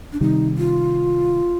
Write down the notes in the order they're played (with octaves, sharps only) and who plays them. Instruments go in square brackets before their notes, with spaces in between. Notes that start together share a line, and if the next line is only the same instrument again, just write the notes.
[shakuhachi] D4
[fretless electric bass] C3 D#3 G3 [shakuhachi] D#4
[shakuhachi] F4